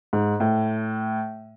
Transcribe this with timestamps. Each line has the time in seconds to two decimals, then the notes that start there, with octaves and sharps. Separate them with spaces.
0.13 G#2
0.40 A2